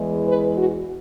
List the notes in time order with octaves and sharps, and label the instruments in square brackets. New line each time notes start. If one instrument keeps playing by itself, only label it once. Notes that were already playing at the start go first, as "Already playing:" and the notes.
Already playing: [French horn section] E2 E3 G#3
B4
F#4